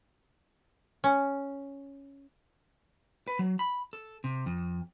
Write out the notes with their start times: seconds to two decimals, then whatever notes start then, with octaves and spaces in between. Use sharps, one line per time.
1.04 C#4
3.28 B4
3.39 F#3
3.59 B5
3.93 A4
4.24 C3
4.46 F2